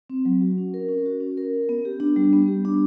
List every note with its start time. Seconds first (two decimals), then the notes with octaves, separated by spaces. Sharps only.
0.10 C4
0.25 F#3
0.41 F#4
0.58 C#4
0.74 A#4
0.89 C#4
1.06 F#4
1.20 C#4
1.37 A#4
1.53 C#4
1.69 B3
1.85 G4
2.00 D4
2.16 G3
2.33 B3
2.48 G4
2.65 D4